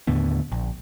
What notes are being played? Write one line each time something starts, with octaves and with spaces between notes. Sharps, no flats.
D#2 A2 D3 B3
A#1